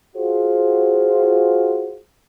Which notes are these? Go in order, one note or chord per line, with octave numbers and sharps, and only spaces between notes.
F4 F#4 G#4 C5